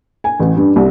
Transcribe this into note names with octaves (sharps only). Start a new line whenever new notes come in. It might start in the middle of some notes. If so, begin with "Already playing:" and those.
G#5
A1
G2
C2